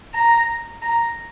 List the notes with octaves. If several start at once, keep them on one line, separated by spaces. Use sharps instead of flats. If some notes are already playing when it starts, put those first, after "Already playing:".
A#5
A#5